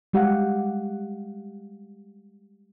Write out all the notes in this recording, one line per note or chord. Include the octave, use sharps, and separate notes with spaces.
G3 G#3 G4 F5 F#5